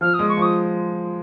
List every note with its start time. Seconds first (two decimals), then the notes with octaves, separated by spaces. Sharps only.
0.01 F3 F6
0.14 G#3 D#6
0.29 C#6
0.37 F3
0.42 D#6